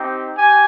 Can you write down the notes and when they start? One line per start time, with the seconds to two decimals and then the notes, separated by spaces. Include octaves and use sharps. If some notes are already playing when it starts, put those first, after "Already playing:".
Already playing: C4 D#4 G4
0.36 G4 G#5